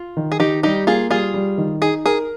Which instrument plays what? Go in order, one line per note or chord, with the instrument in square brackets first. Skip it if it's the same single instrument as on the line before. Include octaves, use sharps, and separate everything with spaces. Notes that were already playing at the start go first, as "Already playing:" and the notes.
Already playing: [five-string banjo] F4
[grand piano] D#3
[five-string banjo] G#4
[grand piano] D#3 [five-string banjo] D#4 G4
[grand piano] G3 [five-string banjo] D#4 G4
[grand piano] A#3 [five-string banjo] F4 G#4
[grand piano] G3 [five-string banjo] F4 G#4
[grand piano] G3
D#3
[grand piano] D#4 [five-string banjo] G#4
[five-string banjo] G#4 [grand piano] A#4